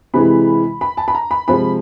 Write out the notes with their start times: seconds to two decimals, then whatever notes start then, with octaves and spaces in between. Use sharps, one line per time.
0.14 C3 E3 G#3 B5
0.81 B5
0.97 A5
1.08 B5
1.15 A#5
1.31 B5
1.48 C3 F3 G#3 B5